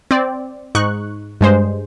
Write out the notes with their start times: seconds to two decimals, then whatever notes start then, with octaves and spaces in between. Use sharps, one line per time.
0.11 C4 D5
0.75 G#2 D#4 C#6 F#6
1.41 G2 G#3 C5